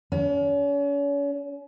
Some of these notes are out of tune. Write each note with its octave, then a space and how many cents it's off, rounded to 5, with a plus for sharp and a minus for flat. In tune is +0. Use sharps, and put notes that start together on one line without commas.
C#4 +40